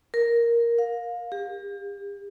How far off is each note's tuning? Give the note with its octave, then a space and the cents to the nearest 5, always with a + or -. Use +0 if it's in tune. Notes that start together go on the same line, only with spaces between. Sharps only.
A#4 +5
F5 +25
G4 +40